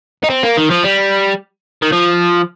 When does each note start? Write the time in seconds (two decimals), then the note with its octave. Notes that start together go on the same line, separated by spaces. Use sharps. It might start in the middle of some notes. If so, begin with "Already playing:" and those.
0.24 D#4
0.30 C4
0.43 A#3
0.57 D#3
0.70 F3
0.84 G3
1.82 D#3
1.92 F3